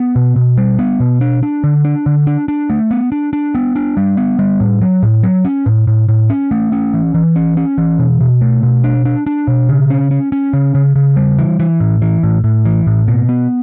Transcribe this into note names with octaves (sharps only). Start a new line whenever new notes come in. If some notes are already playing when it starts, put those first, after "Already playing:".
Already playing: B3
B2
B2
G3
B3
B2
D4
D4
D3
D4
D3
D4
D4
A3
B3
D4
D4
B3
D4
G3
B3
G3
A2
F#3
A2
F#3
C#4
A2
A2
A2
C#4
A3
C#4
E3
E3
C#4
C#4
E3
B2
B2
A3
B2
D4
D4
D4
B2
C#3
C#4
C#4
C#4
C#3
C#3
C#3
G3
E3
E3
A2
E3
A2
A2
E3
A2
B2
B3